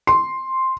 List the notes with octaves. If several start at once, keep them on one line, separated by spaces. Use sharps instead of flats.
C6